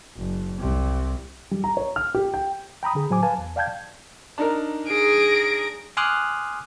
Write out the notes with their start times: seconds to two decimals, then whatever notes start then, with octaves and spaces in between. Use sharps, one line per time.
0.18 F#1
0.59 C2 C3
1.51 G3
1.64 A#5
1.77 C#5
1.96 F6
2.15 G4
2.34 G5
2.83 G5 A#5 B5 D#6
2.95 D3 G#4
3.10 A2 F#3 C5 G#5 D6
3.23 B4 F5 G#5 A5
3.38 E2
3.56 D5 F5 G5 A5 G6 G#6
4.38 D4 D#4 A#4
4.88 G#4 A#6 D7
5.97 G#5 C6 D6 D#6 F6 F#6